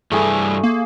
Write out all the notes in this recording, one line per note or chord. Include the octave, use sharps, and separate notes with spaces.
G2 E3 A3 G#4
A#3